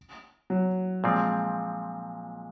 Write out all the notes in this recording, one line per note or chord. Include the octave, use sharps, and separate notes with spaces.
F#3
A#2 F3 G#3 C4